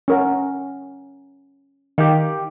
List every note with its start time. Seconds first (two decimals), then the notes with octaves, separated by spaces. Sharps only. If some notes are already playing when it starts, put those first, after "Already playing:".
0.08 C#4 A#4 F#5
1.98 D#3 G4 F5